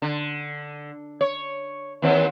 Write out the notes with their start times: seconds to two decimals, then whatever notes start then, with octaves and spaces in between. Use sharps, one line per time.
0.02 D3
1.21 C#5
2.02 D#2 E3 C4